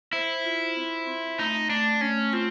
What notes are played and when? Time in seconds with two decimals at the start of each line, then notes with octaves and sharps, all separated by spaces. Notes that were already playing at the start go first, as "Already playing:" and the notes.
0.13 E4 C5
0.44 F4
0.77 C4
1.07 C4
1.39 A3 D#4
1.70 A3 D4
2.01 A3 C#4
2.33 C4 F4